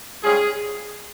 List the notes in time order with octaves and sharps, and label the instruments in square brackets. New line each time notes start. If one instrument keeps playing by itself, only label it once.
[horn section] G#2 G3 C#4 F4 G#4